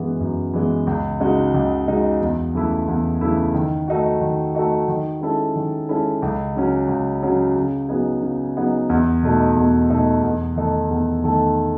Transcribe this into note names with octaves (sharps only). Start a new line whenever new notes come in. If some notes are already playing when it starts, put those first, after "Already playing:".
Already playing: F#2 E3 G#3 B3
F#2
E3 G#3 B3
C#2
C#3 G#3 D#4 F#4
C#2
C#3 G#3 D#4 F#4
E2
C#3 E3 A3 E4
E2
C#3 E3 A3 E4
D#3
A3 D#4 F#4
D#3
A3 D#4 F#4
D#3
G#3 C#4 E4 A4
D#3
G#3 C#4 E4 A4
C#2
C#3 F#3 C#4
C#2
C#3 F#3 C#4
C#3
F#3 B3 D#4 G#4
C#3
F#3 B3 D#4 G#4
E2
B2 A3 D#4
E2
B2 A3 D#4
E2
D#3 A3 D#4 A4
E2
D#3 A3 D#4 A4